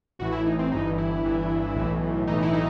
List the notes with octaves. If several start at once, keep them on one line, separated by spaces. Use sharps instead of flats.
A1 A2 E3 F#4
E4
D#4
C4
G1 G2 E3 D#4
E4
G1 G2 E3
B1 A2 E3
B1 A2 E3 D#4
E4
D#4